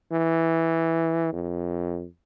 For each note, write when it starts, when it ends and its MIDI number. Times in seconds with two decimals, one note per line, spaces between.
0.12 1.31 52
1.33 2.05 41